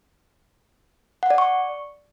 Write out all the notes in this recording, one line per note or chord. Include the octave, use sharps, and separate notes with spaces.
F#5
D5
C#6